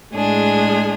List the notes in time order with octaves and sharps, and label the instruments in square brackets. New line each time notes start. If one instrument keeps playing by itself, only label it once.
[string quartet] A2 G#3 D4 G#4